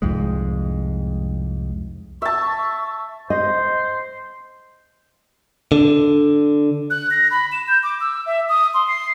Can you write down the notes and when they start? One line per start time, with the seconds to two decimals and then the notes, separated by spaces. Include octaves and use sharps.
0.02 C2 F2 G#2 G#3
2.22 E5 A5 C#6
3.30 C5 D#5
5.72 D3
6.90 F#6
7.11 A#6
7.31 B5
7.52 E7
7.68 G6
7.83 D6
8.01 E6
8.26 E5
8.49 D#6
8.74 C6
8.88 C7